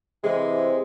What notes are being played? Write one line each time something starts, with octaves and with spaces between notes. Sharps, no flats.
C3 E3 G#3